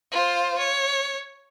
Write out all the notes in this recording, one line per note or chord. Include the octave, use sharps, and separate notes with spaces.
F4 C5
C#5